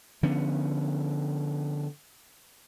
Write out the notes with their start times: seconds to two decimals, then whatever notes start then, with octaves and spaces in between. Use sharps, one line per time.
0.23 D3 F3 B3 C#4